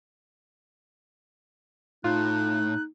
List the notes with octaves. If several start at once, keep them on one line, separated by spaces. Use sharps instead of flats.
A2 D#4 F4 F#6